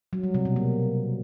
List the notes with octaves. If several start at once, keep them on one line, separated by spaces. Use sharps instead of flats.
F#3
G3
C3
B2
A#3